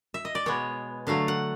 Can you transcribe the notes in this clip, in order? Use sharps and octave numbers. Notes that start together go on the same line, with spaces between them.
E5
D#5
D5
B2 G#3 B3 C#5
D3 F#3 A3 F5
F#5